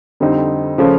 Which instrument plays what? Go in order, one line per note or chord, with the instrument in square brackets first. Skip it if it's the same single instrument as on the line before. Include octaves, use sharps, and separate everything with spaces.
[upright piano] F2 D3 G3 C4 D#4
C#3 F3 A3 C#4